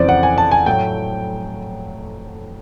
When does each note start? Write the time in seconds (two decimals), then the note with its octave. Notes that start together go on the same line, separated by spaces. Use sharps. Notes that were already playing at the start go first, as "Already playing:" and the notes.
Already playing: F2 C#3 E3 C5 D5
0.09 F#5
0.23 G#5
0.38 A5
0.51 G#5
0.66 A2 F#3 A3 G5